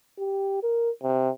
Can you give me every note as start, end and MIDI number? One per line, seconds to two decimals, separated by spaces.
0.19 0.61 67
0.63 0.90 70
1.03 1.29 48